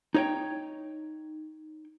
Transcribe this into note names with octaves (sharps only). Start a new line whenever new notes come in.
D#4 C#5 G5